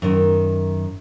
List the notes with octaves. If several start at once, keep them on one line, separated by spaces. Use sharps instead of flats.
F#2 D#3